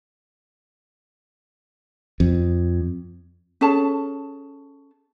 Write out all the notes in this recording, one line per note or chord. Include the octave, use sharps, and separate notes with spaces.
F2
C#4 G#4 A4 A5